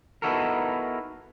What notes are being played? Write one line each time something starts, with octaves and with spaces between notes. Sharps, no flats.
B3 D#4 E4 F#4 A4 A#4